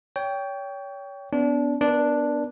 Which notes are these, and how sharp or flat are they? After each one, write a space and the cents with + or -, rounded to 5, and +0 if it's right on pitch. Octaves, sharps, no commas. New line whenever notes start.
C#5 +30 G5 +0
B3 +15 D4 -25
B3 +0 D4 +0 A#4 +40